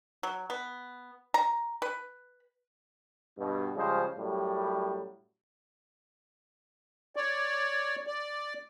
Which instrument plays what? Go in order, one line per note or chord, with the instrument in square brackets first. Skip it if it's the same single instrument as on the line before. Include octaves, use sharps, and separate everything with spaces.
[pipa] F#3
B3
A#5
B4
[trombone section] G2 B2
C#3 F3 G3 G#3 C5
F#2 A2 F#3 G3
[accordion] C#5 D5
D5